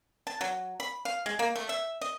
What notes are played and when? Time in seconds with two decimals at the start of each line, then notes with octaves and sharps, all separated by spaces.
0.27 A5
0.41 F#3
0.80 B5
1.05 F5
1.26 G#3
1.39 A#3
1.56 A3
1.69 E5
2.01 D#5